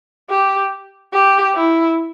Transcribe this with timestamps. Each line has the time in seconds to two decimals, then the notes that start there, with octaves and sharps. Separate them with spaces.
0.29 G4
1.13 G4
1.55 E4